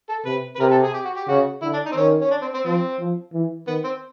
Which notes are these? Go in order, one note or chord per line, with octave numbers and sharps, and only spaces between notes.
A4
C3 B4
B4
C3 A#4
A4
G#4
G4
F#4
G4
C#3 F#4
D3 E4
D4
D#4
C4
D#3 C#4
C#4
D4
C4
C4
F3 C4
F3
E3
D#3 B3
C4